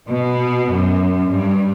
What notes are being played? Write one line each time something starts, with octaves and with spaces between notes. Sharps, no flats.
B2
F#2
G2